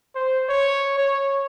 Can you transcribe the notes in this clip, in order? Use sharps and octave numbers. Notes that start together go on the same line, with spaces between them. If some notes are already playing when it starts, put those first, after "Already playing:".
C5
C#5
C#5